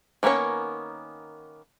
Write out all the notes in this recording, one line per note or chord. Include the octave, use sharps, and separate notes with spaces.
D#3 A#3 B3 C#4 C#5